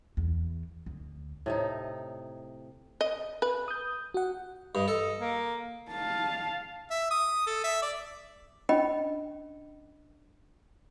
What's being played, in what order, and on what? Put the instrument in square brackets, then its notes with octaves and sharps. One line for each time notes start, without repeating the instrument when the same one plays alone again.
[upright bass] E2
D2
[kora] A2 C3 D#4
[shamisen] D#5
B4
[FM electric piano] D#6 G6
F#4 F#5
[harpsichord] G2 [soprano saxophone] D#5
[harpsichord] A4 [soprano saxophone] D#5
[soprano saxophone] A#3
[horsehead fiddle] F5 A5
[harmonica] E5
D#6
A4
E5
D5
[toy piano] C#4 D4 D#5 G5 B5